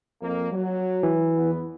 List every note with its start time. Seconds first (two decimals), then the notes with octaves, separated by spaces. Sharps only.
0.22 F2 A#3
0.51 F#3
1.03 E3
1.36 E2 B3